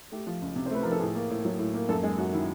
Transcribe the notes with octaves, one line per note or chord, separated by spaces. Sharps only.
A3 G4
F3
C#2
C3
C5
A3 B4
F3 A#4
A4
A2 G#4
A#3
A2
F#3
A2
A#3
F#2 A4
G#3 G#4
F#2 F#4
D#3 E4